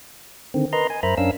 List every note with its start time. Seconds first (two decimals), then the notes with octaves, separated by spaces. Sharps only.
0.54 D3 D#3 C4
0.73 A#4 B4 D#5 A#5 C6
0.90 G#5
1.03 F#2 A#4 C5 E5 A#5 B5
1.18 F#2 C#4 D4 A#4 F5 E6